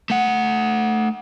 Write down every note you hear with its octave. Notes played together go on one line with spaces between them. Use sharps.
A3 F#5